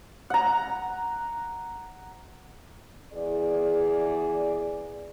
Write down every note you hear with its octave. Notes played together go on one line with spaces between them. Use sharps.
F#5 A#5
E2 G#4 D5